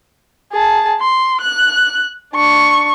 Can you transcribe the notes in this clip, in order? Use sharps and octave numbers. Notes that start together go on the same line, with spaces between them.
G#4 A5
C6
F#6
D4 C#6